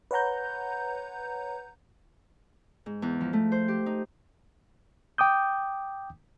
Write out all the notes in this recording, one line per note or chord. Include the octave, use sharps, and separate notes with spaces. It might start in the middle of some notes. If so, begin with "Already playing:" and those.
B4 C#5 F#5 A#5 G6
G#2
E2
F3
A3
C5
G4
D#4
G5 D6 D#6 G6